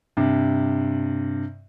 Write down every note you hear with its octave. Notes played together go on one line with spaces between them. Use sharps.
G2 C3